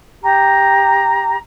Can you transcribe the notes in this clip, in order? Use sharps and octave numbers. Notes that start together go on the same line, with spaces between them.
G4 A#5